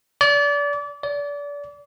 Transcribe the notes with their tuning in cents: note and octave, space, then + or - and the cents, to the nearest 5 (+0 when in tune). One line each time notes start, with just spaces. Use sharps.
D5 -30
D5 -30